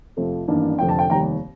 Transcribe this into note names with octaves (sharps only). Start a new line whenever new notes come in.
F2 C3 F3 A3
A1 G2 D#3 A#3 D4
F1 F2 D3 G5
A5
G5
F1 D#2 D#3 G3 G5 A#5